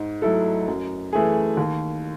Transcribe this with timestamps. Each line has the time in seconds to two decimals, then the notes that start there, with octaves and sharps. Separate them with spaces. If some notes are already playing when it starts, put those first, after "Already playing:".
Already playing: G#2
0.22 F#3 A3 E4 A4
0.68 F#2
1.13 E3 A3 E4 G#4
1.57 D#2